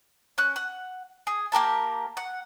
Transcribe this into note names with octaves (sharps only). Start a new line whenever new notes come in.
C#4 F#6
F#5
G#4
A#3 G4 A#4 A5
F#5